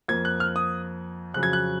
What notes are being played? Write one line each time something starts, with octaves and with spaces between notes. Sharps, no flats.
F2 F3 A#3 G#6
F#6
F6
D#6
F2 C#3 F#3 F#6
G#6
F#6